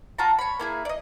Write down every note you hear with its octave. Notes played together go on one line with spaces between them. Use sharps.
F4 F#4 A5 A#5
C#5 B5
A#3 E4 G#4
D5 D#5